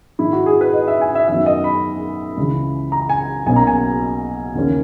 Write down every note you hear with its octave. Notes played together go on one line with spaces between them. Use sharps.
G#2 D#3 G#3 E4
F#4
G#4
B4
D#5
E5
G#5
E5
F#2 D#3 F#3 B3 E5
D#5
B5
C#2 C#3 E3
A#5
G#5
B1 B2 A#3 C#4 G#5
A#5
G#5
D#2 C#3 E3 A#3 C#4